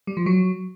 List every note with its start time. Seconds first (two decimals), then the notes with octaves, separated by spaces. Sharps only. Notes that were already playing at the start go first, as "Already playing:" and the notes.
0.07 G3
0.17 F3
0.26 F#3